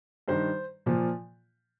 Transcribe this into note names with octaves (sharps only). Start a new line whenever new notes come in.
G2 D#3 C5
A#2 F3